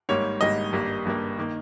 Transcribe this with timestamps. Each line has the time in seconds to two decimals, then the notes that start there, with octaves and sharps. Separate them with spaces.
0.09 G#1 G#2 G3 A#3 C#5
0.41 G#1 G#2 G3 A#3 D#5
0.72 G#1 G2 G3 A#3
1.05 G#1 G2 G3 A#3
1.39 D#3 A#3